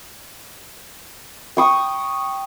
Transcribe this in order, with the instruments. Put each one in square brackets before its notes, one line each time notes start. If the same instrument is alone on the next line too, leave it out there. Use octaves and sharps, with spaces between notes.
[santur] G5 C#6 D#6